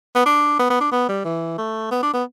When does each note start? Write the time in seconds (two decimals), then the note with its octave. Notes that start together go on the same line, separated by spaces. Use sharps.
0.15 B3
0.26 D4
0.59 B3
0.70 B3
0.81 D4
0.92 B3
1.09 G3
1.25 E3
1.58 A3
1.91 B3
2.03 D4
2.13 B3